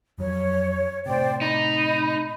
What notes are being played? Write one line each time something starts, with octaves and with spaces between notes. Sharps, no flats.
F2 F#3 C#5
A2 C3 C5 D5 G5
D#4 B5